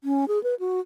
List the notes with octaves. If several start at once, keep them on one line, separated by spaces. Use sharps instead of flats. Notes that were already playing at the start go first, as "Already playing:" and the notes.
C#4
G#4
B4
F#4